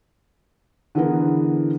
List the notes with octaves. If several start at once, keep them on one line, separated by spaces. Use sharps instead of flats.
D3 E3 B3 G#4 A#4 B4